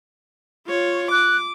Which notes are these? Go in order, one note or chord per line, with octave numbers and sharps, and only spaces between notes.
F4 C#5
D6 F#6